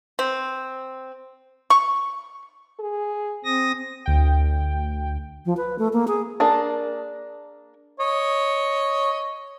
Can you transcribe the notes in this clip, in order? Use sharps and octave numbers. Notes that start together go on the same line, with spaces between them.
C4
C#6
G#4
C4 D#6 A#6
D2 G5
F3
B4
A3
A#3
G#4
A#3 D4 G#4 A5
C#5 D#5